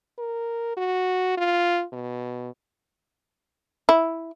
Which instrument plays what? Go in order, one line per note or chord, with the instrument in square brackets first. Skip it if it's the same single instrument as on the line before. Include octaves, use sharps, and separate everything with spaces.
[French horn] A#4
F#4
F4
B2
[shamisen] E4